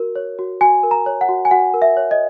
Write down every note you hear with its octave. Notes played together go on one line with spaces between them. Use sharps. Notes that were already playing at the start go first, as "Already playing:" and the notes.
Already playing: F#4 A#4
C#5
F#4
F#4 G#5
A#4
A#5
C#5
F#5
F#4
G#5
F#4 F#5
A#4
E5
C#5
D#5